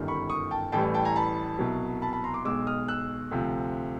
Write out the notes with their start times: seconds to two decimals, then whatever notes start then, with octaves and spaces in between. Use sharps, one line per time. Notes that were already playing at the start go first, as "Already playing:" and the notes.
Already playing: G1 F#2 D#3 G3
0.08 B5 C#6
0.30 C#6 D#6
0.51 G5 A5
0.72 A1 A2 E3 G3 G5 A5
0.94 G5 A5
1.05 G#5 A#5
1.16 A5 B5
1.59 C2 B2 F#3
2.02 A5 B5
2.13 A5 B5
2.24 A#5 C6
2.34 C6 D6
2.45 B1 B2 G#3 D6 E6
2.67 D#6 F6
2.88 E6 F#6
3.31 D2 C3 F3